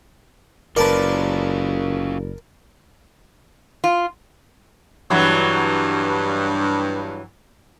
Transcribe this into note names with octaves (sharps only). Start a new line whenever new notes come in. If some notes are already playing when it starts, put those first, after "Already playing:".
F#1 C#4 F4 A#4 B4 D5 A5
F4
G2 E3 F#3